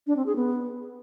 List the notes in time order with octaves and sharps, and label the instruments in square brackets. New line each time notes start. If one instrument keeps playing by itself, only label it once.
[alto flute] D4
C4
G#4
B3